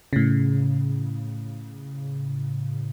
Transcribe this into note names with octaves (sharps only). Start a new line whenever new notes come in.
A2 C#3